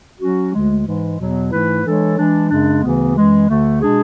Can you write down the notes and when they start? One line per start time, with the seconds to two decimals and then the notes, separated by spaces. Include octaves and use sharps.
0.20 F#3 C#4 F#4
0.53 D2 D3 G#3
0.86 G#2 E3 G#3
1.18 E2 B2 F#3 B3
1.51 G#2 E3 A3 E4 B4
1.84 E3 G#3 D4 A4 C#5
2.17 E3 G#3 D4
2.50 F#2 C#3 G#3 D4
2.83 D2 C#3 E3 B3
3.16 F#2 E3 G#3
3.49 D2 D3 A3
3.82 B2 G#3 D4 G#4